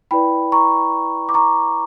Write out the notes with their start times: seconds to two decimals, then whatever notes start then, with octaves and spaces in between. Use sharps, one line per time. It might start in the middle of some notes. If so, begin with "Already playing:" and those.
0.11 E4 B4 D5 G5 B5
0.52 A#5 C#6
1.29 D6
1.34 A#5 C#6